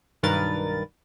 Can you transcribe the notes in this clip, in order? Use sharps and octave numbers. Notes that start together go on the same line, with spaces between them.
B1 G2 D#3 A#4 B4 A6